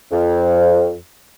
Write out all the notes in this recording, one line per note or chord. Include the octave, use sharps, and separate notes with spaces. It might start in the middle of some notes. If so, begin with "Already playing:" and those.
F2